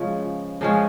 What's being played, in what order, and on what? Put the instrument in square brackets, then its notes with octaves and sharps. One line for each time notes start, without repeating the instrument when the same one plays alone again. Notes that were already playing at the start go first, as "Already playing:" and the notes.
Already playing: [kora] C#3 F3 G#3 C#4
C#3 F3 G#3 C#4